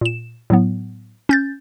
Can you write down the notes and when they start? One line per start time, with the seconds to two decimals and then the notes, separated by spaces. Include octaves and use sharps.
0.01 A#2 E7
0.50 A2 F#3 B3
1.29 C#4 G6 A6